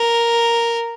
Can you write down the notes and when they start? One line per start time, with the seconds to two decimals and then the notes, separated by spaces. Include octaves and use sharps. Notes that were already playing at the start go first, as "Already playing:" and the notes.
Already playing: A#4